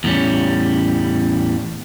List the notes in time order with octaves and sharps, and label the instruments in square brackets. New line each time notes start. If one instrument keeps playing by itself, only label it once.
[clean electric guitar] E2 A2 G3 C#4